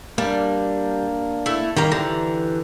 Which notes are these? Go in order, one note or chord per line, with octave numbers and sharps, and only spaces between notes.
G3 A#3 D4
A3 E4
D#3 G3 A#3 A#5
D3 E3 G4 A#5